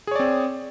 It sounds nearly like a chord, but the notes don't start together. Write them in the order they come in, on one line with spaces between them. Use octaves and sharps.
G#4 C#5 D5 C4